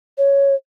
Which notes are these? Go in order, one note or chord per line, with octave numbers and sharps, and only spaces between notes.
C#5